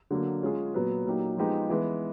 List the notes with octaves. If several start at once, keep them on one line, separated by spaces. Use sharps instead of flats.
D3 F#3 A#3
G#3 C#4 F4 G#4
A#2 F#3 B3
A#2 F#3 A#3 D#4 G4
F3 G#3 B3 D#4 G4
E3 G#3 B3